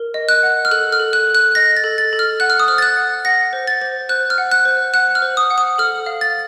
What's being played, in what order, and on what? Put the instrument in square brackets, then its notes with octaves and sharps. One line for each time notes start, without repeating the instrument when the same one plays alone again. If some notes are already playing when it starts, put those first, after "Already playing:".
Already playing: [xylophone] A#4
D#5
F#6
F#5
F6
A4 F#6
F6
A4
F#6
A4
F#6
D#5 A#6
A6
A4
A6
A4
F6
F#5 F#6
F6
D#6
C5 F6
A6
F#6
F#5
F#5 A#6
C5
A6
C5
C5 F#6
F6
F#5
F#6
C5
F#5 F#6
F6
C5
D#6
F#5
D#6
A4 F6
F5
A6